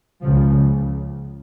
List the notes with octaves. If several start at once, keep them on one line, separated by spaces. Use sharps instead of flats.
C#2 C#3 F3